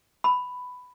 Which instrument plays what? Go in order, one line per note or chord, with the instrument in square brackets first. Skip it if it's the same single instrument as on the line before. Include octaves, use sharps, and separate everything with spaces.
[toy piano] B5